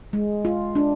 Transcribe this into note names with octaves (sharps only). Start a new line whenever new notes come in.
G#3
F4
D4